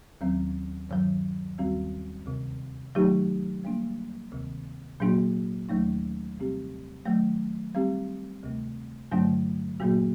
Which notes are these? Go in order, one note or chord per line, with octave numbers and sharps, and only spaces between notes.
D#2 D#3 F#3 C4
G2 D#3 F#3
D#2 D#3 G3 C4 F#4
D2 C3 D#3
D#3 F#3 A3 D#4 G4
G3 A#3 D4
D2 C3 D#3
A#2 F#3 A#3 D4 F#4
D#2 D#3 F#3 A3 D#4
C3 G3 C4 G4
D#3 F#3 A3
G3 C4 G4
D2 C3 D#3 A3
G2 D3 F#3 A3 D4
A#2 F#3 A#3 F#4